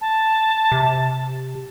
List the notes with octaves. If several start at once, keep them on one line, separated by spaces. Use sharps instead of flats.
A5
C3